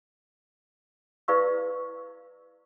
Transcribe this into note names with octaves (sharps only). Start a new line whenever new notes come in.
E4 B4 D5 F5 C#6 E6